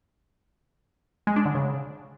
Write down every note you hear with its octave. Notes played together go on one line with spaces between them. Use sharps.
G#3
D4
D3
C#3